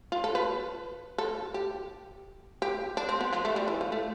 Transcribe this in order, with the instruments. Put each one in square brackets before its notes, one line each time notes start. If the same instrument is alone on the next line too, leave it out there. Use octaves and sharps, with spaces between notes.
[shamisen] F4
A4
B4
A4
G4
G4
D4
C4
B3
F3
A3
G3
E3
F3
A3